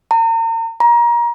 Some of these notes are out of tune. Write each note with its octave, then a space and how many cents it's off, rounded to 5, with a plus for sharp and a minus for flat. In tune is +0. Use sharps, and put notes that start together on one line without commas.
A#5 -40
A#5 +25